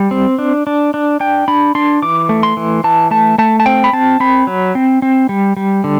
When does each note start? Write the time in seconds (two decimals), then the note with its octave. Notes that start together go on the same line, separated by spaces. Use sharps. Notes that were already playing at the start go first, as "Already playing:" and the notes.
Already playing: G3
0.11 C4
0.39 D4
0.67 D4
0.94 D4
1.20 D4 G5
1.48 D4 B5
1.75 D4 C6
2.02 E3 D6
2.29 A3
2.43 C6
2.57 E3
2.84 E3 A5
3.11 A3 A5
3.38 A3 A5
3.60 A5
3.66 C4 G5
3.84 B5
3.93 C4 A5
4.20 C4 B5
4.47 F#3
4.75 C4
5.02 C4
5.29 G3
5.57 G3
5.84 D3